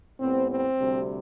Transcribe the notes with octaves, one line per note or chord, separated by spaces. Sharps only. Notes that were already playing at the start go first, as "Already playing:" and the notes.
A2 G3 B3 C4
C4
D2 C3 G3